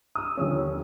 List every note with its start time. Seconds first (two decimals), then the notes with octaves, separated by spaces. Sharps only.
0.15 D#6 E6
0.37 D#2 D3 F3 C#4